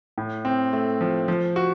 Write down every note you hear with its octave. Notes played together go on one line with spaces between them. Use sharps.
A2
C4
A3
F3
F3
F#4